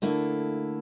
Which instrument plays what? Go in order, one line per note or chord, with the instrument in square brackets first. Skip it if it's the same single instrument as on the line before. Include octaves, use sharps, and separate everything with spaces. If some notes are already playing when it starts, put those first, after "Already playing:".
[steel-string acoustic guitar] D3 A3 A#3 E4